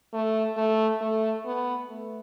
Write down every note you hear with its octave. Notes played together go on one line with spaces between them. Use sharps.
A3
A3
A3
B3
A3